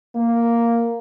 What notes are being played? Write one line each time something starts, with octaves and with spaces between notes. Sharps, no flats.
A#3